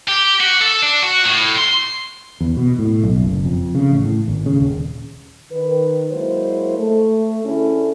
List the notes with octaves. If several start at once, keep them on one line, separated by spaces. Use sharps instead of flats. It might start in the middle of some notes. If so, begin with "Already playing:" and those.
G4
F#4
A4
D4
F#4
A2
C6
E2
B2
A2
B1
F#1
F2
C#3
A1
A2
G#1
C#3
D#1
D#3 B4
F#3 G#3 A#3 E4 C5
A3
D2 C#4 D4 E4 G#4 A4